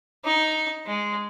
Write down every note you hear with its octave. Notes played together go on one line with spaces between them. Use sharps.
D#4
G#3